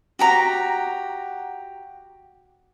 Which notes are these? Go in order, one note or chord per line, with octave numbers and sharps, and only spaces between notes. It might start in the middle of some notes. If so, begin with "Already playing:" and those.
F#4 G4 A#5